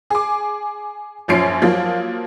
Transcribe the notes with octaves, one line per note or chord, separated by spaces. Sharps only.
G#4 D6
A#1 F#2 F3 C#5 C7 D7
F3 F#3 A#3 F4